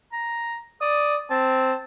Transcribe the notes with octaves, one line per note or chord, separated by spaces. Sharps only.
A#5
D5 D#6
C4 A5